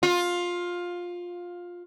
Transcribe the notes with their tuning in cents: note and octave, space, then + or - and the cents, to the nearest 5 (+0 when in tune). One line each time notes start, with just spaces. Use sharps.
F4 +15